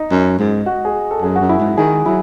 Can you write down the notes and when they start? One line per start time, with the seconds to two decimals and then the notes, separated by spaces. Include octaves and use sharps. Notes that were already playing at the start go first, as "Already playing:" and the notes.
Already playing: D#4
0.11 F#2
0.39 G#2
0.66 F#4
0.85 G#4
1.11 A4
1.22 F#2 G#4
1.35 F#4
1.41 F#2
1.49 E4
1.59 G#2
1.77 D#3 G#4
2.05 F#3 E4